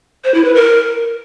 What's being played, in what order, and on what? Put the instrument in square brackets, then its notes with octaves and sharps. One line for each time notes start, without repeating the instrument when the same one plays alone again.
[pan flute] C5
E4
B4
A#4